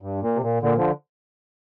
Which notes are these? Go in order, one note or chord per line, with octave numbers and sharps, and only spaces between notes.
G2
A#2
C3
A#2
A#2 D3
D3 F3